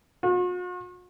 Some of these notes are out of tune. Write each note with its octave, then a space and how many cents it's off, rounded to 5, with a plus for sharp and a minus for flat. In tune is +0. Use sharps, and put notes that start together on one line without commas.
F#4 -45